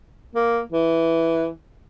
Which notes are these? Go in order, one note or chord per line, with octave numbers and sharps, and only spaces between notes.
A#3
E3